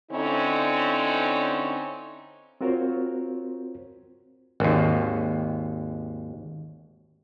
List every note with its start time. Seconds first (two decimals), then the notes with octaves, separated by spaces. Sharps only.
0.11 D3 C4 C#4 D#4 E4
2.61 C4 F4 F#4 A#4 C5 C#5
4.60 G#1 D#2